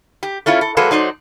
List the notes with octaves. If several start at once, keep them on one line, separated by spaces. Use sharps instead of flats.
G4
A3 C#4 E4 F4
A4
F#3 G#3 A#3 A4 B4
F#3 D#4 C5 D5